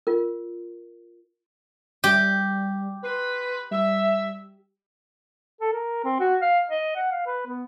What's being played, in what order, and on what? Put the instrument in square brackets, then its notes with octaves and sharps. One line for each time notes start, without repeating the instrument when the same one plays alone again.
[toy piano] F4 A#4
[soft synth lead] G3 [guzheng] G4
[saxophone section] B4 [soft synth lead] C6
[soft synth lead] G3 [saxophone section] E5
[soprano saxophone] A4
A#4
C4
F#4
F5
D#5
F#5
F5
B4
B3